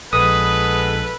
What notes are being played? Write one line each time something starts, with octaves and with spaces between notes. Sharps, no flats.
A#1 G#3 B3 A4 B4 D#6